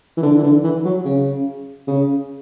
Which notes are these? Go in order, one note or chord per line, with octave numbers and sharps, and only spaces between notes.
E3
D3
E3
D3
E3
F#3
C#3
C#3